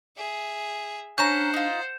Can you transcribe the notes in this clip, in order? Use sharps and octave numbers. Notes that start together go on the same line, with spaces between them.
G#4 E5
C#4 D4 C5 F#5 A#5 G6 E7
D#4 F4